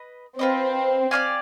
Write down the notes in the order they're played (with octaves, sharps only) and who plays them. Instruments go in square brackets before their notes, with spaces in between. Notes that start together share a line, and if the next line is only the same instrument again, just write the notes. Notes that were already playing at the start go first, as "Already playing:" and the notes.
Already playing: [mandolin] B4 D#5
[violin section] C4 [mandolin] F4 B4 D#5
[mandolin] G4 D5 F5 G#5